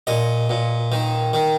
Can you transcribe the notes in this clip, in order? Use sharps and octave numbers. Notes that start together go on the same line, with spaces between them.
A#2 D#5
A#2
D#3
D#3